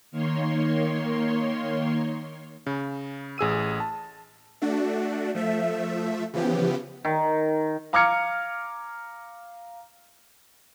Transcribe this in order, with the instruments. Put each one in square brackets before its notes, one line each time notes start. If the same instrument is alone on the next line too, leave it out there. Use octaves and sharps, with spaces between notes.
[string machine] D#3 A#3 C#5 C6
[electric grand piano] C#3
A1 G#4 E6 D#7
A5
[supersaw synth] A3 D4 F#4
F3 A3 E5
C#3 E3 F3 B3 G4
[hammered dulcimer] D#3
[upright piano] F5 A#5 D6 F6 G#6 C#7